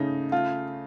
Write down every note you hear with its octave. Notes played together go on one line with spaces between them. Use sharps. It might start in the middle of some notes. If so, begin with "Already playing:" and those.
Already playing: C#3 A3 D#4
A3 F4